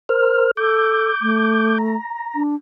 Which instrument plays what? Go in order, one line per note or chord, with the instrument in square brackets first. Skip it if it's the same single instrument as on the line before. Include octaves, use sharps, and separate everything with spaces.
[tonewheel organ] A#4 C5 F6
[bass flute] A4 [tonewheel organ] D6 G6
[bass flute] A3
[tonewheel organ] A#5
[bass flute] D4